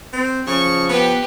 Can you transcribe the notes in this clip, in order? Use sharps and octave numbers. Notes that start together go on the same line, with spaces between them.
C4
C#3 F3 C#6
B3 G4 B4